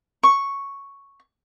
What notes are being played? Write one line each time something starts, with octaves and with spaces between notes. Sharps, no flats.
C#6